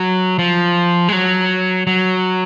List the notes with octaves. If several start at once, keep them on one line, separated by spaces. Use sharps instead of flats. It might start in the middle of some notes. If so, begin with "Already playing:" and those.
Already playing: F#3
F3
G#3
F#3
F#3